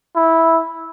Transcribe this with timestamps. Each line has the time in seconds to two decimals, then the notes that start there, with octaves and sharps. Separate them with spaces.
0.16 E4